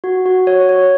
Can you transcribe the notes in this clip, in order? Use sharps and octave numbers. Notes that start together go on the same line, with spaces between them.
F#4
F#4
C#5
C#5